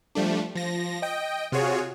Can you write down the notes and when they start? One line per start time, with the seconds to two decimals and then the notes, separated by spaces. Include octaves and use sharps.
0.15 F3 G3 A3 D4
0.55 F3 A#6
1.02 D#5 G5
1.52 C3 F4 F#4 G#4 C#5